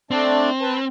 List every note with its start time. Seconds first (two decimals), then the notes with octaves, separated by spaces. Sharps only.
0.11 A3 C4 D4 D5
0.61 B4 A5